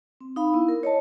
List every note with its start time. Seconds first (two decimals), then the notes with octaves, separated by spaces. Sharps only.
0.21 C4
0.36 D#4 F5 B5
0.54 B3 E4
0.68 A#4
0.83 C#5 D#5 A5